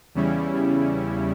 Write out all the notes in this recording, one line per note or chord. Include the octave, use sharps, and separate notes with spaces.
E2 C#3 G3 C#4 E4